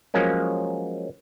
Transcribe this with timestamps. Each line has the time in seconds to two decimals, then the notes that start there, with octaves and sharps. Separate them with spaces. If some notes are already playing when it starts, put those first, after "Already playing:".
0.14 F3 F#3 G#3 A#3 C#4